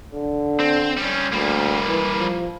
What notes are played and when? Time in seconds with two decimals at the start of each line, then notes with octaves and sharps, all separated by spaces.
0.13 D3
0.60 C4
0.97 G3 C#4
1.33 D2 G3 A#3
1.88 E3
2.19 F3